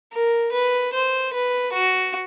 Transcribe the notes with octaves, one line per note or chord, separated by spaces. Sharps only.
A#4
B4
C5
B4
F#4